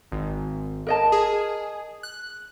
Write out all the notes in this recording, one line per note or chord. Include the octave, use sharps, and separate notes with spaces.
G#1
A#4 D#5 A5
G#4
F#6